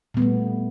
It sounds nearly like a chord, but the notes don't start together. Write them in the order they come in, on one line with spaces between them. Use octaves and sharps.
A#2 B3 G3 A3